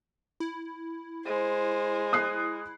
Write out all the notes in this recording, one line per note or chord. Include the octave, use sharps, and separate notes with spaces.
E4
G#3 C5
D#6 F#6 C7